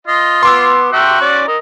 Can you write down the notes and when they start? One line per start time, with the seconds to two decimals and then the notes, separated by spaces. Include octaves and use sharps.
0.07 F4 D#5
0.43 B3 C6 D6 E6
0.93 F#4 E5 G5 A#5
1.21 C#4 D5
1.48 A#4 D#5 A#5